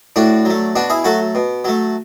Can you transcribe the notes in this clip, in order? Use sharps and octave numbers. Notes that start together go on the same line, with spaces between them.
A2 D4 F#4
F#3 A3
B2 D4 F#4
E4 G#4
F#3 A3 F#4 A4
B2
F#3 A3